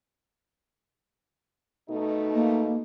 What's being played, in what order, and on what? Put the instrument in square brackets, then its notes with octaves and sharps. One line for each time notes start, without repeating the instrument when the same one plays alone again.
[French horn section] B2 A3 D#4
[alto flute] A#3